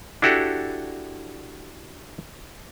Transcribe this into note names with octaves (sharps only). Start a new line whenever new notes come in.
D4 E4 F#4 G4 A4